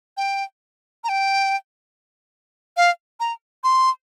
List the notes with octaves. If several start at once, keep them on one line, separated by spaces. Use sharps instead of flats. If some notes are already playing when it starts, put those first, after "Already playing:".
G5
A#5
G5
F5
A#5
C6